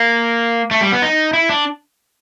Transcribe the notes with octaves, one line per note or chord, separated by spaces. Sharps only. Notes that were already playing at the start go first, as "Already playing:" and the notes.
Already playing: A#3
A3
G3
B3
D#4
E4
D4